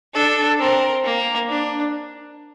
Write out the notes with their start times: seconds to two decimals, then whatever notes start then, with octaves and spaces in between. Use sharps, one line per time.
0.14 D4 A4
0.59 C4 A#4
1.05 A#3
1.49 D4